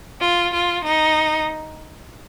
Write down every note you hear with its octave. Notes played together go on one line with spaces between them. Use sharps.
F4
F4
D#4